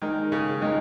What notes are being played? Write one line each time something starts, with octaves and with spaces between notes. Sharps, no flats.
D#3 G#3 D#4 A#4
C#3
D#3 G#3 D#4 A#4